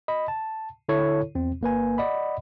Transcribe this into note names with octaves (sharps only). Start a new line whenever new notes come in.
D#5 B5
A5
D3 E4 A4 C#5
E2 C4
G1 A#3 B4 G#5
D5 D#5 F#5 B5